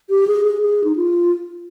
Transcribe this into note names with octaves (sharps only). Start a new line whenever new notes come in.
G4
G#4
G#4
G#4
D#4
F4